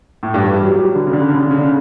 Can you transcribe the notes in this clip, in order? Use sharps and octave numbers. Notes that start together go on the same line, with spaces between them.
A2
G2
E3
G3
F#3
G3
F#3
D3
C#3
D3
C#3
D3
C#3
D3
C#3
D3
C#3